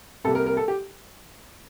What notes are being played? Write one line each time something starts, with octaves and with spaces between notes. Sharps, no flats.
C2 C3 G3 A#3 A4
A#4
A#4
A4
G4